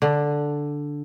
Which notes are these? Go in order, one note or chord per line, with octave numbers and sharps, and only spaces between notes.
D3